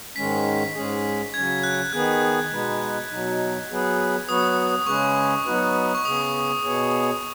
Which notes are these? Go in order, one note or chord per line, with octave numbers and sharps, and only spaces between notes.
G#2 D#3 G#3 C#4 B6
G#2 G#3 C#4 G#4
C#3 F#3 C#4 G#6
F#6
D#3 B3 G#4 F#6
B2 G#3 B3 D#4 B4
B2 F#3 D#4
F#3 B3 G#4 B4
F#3 B3 F#4 B4 D#6
C#3 G#3 C#4 G#4 B4 C#6
F#3 B3 D#4 F#4 B4
C#6
C#3 B3 G#4 D#6
B2 B3 G#4 C#5